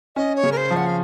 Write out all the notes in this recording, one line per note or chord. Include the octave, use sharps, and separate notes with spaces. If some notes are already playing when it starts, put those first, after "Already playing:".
C#4 D#5
C#5
C#3
A#4
C5
F3
F#5
F5